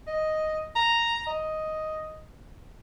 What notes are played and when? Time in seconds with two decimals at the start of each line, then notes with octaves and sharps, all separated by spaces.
0.07 D#5
0.75 A#5
1.27 D#5